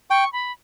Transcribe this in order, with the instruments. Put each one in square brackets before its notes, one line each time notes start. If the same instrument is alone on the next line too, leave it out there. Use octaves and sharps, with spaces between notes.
[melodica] G5 [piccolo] C#6
[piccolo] B5